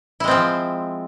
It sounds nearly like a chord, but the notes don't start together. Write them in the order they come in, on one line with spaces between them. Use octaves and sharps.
E4 G#3 C4 F3